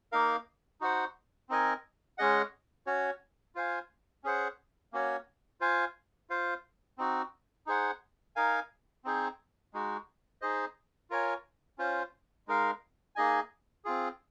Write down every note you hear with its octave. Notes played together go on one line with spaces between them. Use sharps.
A#3 D#4 A#4 F5
D#4 F#4 C5 F#5
C4 D#4 A#4 D#5 G#5
G#3 C#4 G#4 D#5 F#5
C#4 F#4 C#5
F4 C5 F5 G#5
C#4 G#4 C5 F#5
A#3 C#4 F#4 C#5
F4 C5 F5 G#5
F4 C5 F5
C4 D#4 F#4
D#4 G#4 C5 F#5
D#4 A#4 F5 G#5
C4 D#4 G#4 C5
G#3 D#4 F#4
D#4 G#4 C5 D#5
F4 A#4 C#5 G#5
C#4 F4 C5
G#3 D#4 A#4 F5
A#3 D#4 G#4 D#5 G#5
C4 F4 G#4